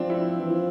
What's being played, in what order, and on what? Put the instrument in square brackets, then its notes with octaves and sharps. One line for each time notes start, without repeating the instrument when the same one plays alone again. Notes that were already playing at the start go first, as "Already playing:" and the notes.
Already playing: [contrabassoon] F3 [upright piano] C4 D4
[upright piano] E4
[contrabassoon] E3
F3